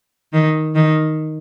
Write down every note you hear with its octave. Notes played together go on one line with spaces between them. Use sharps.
D#3
D#3